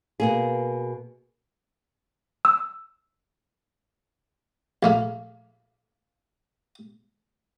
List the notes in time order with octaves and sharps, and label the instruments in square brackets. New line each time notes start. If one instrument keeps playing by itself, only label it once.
[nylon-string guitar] B2 A#3 G#4
[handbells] E6
[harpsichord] A#1 A3 A#3